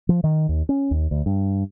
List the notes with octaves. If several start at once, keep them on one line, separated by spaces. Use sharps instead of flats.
F3
D#3
D#2
C#4
D#2
D2
G2